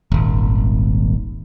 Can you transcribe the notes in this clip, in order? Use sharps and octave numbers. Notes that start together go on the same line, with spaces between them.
D#1 G#1